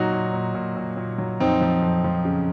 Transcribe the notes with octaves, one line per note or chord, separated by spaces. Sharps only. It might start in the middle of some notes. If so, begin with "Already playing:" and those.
Already playing: A#2 F#3 D#4 F#4
A#2
A#2
A#2
A#2
A#2
F#3
F2 C4 D#4
F3
F2
F3
C#3